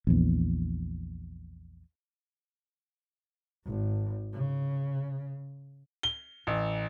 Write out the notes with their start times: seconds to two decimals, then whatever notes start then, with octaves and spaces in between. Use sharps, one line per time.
0.07 A#1 E2
3.66 G#1
4.33 C#3
6.03 G7
6.47 A1